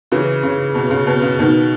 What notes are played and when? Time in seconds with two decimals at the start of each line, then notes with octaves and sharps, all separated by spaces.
0.12 C#3 E3
0.43 C#3
0.75 B2
0.91 C#3
1.07 B2
1.22 C#3
1.39 B2 D#3